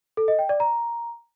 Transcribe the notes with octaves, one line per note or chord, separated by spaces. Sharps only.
A4
D#5
G5
D5
A#5